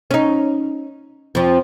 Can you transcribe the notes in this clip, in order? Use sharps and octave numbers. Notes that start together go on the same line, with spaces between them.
C#4 D#4
F2 F3